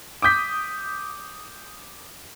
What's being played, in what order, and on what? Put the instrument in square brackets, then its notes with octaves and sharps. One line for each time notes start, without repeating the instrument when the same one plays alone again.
[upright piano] D6 D#6 G6 B6